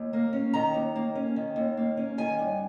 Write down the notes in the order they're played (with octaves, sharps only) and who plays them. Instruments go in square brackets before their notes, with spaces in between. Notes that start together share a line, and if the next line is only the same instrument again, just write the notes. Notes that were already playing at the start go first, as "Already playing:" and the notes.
Already playing: [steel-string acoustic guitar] D#2
A#3
C#4
D#3 A#5
D#2
A#3
C#4
D#3
D#2
A#3
C#4
D#3 G#5
G2